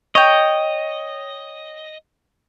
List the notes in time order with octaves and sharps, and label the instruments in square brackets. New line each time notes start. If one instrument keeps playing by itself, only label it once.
[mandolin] C#5 G5 [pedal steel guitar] D#5